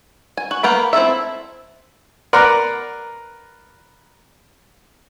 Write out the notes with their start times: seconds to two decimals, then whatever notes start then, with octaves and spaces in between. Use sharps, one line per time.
0.37 G#5
0.51 F#4
0.63 A#3 B3 G5 B5
0.93 C4 E4 A4 E5
2.33 A#4 B4 D5 F#5 A#5 C6